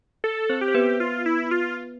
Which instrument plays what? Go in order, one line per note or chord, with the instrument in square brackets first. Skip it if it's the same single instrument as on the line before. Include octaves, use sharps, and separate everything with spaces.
[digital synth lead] A4
[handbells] C4 C5
[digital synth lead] G4
[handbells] C5
B3 B4
[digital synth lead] F4
E4
F4